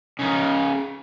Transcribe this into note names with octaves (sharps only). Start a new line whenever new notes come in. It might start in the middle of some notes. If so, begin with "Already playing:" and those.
C#3 D#4